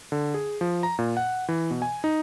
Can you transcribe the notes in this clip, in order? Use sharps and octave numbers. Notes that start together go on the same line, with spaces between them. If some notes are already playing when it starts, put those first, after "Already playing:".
D3
G#4
F3
A#5
A#2
F#5
E3
B2
G#5
D#4